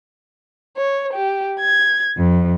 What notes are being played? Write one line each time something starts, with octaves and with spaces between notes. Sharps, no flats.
C#5
G4
G#6
F2